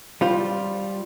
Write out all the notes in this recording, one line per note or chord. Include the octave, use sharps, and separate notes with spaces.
G3 F4 C5